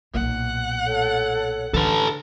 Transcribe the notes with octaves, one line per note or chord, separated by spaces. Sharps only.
B1 A#2 F#5
A4 C#5
D3 A4 B4 A5